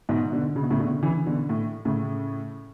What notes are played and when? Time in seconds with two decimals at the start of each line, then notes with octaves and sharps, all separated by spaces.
0.09 G#2 B2
0.32 B2 D3
0.56 C#3
0.63 B2
0.70 A2 C#3
0.79 B2 D3
1.03 C#3 E3
1.27 B2 D3
1.49 A2
1.85 A2 C#3